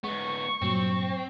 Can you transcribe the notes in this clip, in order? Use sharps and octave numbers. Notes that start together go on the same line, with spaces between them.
G#2 G#3 B3 C#6
G2 A#2 F#3 C4